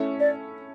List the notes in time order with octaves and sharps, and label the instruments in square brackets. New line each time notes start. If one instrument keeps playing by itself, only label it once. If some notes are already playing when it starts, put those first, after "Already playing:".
Already playing: [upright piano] A3 C#4 E4 A4 C#5
[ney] D5